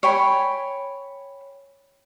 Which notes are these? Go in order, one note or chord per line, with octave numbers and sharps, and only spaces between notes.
C#5 G5 G#5 B5